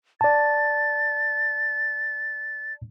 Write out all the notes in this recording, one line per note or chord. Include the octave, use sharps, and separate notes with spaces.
D5 A5 A6